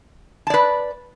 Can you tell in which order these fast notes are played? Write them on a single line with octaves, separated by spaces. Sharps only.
A5 D5 B4